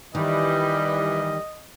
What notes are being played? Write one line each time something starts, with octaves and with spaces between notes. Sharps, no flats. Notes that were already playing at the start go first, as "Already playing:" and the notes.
D#3 E3 G3 D#5